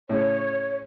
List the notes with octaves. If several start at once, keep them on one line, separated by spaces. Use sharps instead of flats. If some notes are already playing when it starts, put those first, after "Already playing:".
A2 C#3 C#5